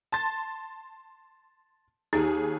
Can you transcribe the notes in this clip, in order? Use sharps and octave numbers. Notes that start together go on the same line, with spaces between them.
A5 C6 A6
D#2 D#4 G4 G#4